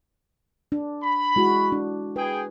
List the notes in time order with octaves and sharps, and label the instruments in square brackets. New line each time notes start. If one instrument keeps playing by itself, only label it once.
[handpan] D4
[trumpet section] B5
[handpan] G#3 E4 F#4
D4
[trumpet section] G#4 G5 [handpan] B4